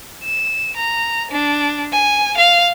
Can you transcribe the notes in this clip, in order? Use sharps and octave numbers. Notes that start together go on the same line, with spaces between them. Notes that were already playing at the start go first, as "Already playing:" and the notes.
E7
A#5
D4
G#5
F5